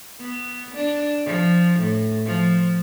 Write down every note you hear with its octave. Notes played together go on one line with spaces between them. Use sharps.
B3
D4
F3
A2
F3